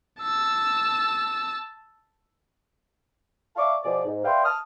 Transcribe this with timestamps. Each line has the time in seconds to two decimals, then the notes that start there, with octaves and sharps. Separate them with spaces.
0.21 A5 E6
3.56 D5 E5 F5 A5 C#6 D6
3.84 B2 F3 G#4 D5
4.04 G#2
4.25 B4 D5 E5 F5 G5 C6
4.45 A5 D#6 F6